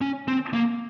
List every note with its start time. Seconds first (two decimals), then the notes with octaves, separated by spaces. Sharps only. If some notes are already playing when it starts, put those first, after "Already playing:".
0.01 C#4
0.28 C4
0.53 A#3